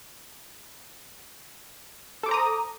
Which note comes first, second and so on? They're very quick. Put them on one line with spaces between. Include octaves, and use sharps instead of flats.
A4 D6 C5 A#5 D#6